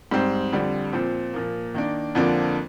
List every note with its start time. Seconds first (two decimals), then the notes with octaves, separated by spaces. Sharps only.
0.11 G#2 G3 C4
0.52 F2 D3 G3
0.93 A#2 F3 C4
1.33 A#2 F3 A#3
1.74 D#3 A#3 D4
2.15 F2 D3 F3 A#3 D4